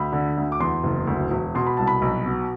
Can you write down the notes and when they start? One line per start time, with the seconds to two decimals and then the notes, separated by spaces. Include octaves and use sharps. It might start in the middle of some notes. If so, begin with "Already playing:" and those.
Already playing: D2 B5
0.12 D3
0.37 D2
0.52 D6
0.60 E2 C6
0.83 F#1
1.07 D2
1.31 E1
1.55 B2 C6
1.67 B5
1.77 C2 A5
1.87 B5
2.02 B1
2.26 B2